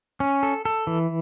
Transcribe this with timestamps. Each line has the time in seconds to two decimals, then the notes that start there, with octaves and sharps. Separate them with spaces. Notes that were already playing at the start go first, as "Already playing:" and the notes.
0.20 C#4
0.43 A4
0.65 A4
0.87 E3